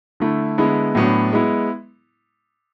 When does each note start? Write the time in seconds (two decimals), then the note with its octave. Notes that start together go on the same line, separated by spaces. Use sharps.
0.20 D3 A3 E4
0.58 D3 G#3 B3 E4
0.95 A2 F#3 B3 D4
1.33 G#3 B3 E4